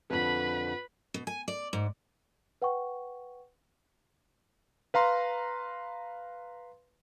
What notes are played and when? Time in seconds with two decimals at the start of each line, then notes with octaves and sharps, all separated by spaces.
0.10 F2 D3 B4 B5
1.14 B2
1.27 G#5
1.48 D5
1.73 G#2
2.62 B4 F#5 G5 C#6
4.94 B4 F5 A#5 C6